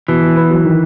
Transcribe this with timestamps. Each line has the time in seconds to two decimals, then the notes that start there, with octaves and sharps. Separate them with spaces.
0.08 B2 E3
0.23 B2
0.36 B3
0.51 F#3
0.65 D#3